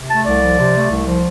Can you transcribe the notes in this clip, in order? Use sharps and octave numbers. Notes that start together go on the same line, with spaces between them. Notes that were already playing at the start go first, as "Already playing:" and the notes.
Already playing: C3
A3 A5
C2 D5
F3
C3
A3
C2
F3